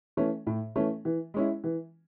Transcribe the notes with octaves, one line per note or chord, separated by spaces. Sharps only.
E3 A3 C#4
A2
E3 A3 C#4
E3
G#3 C#4 E4
E3